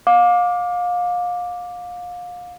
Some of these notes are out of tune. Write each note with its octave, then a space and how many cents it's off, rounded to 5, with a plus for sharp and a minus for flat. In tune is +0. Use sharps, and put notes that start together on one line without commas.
F5 +30 D6 +0